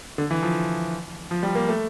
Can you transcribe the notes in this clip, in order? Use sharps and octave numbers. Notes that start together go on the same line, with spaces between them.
D3
E3
F3
F3
G3
A#3
A3